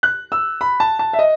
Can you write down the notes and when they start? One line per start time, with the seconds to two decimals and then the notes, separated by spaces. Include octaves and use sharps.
0.03 F#6
0.32 E6
0.61 B5
0.80 A5
0.99 A5
1.13 E5
1.19 D#5